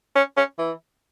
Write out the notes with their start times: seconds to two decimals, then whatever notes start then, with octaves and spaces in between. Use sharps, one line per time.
0.16 C#4
0.37 C#4
0.59 E3